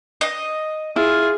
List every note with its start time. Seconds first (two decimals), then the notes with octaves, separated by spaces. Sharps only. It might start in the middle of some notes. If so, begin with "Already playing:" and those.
0.21 D#5
0.96 E4 F4 G#4